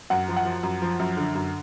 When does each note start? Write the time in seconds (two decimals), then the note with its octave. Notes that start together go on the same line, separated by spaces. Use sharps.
0.10 F#2 F#5
0.28 F3
0.37 F#5
0.45 F3
0.63 F#2
0.82 F3
1.00 F#2
1.17 D3
1.35 F#2